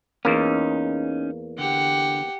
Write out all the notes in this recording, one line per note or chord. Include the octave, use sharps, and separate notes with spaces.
E2 A#3 C#4 D#4
D3 G4 F#5